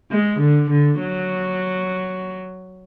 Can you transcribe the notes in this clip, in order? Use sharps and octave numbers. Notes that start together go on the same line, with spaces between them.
G#3
D3
D3
F#3